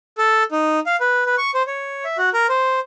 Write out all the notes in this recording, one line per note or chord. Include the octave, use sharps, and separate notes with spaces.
A4
D#4
F5
B4
B4
C#6
C5
C#5
E5
F#4
A#4
C5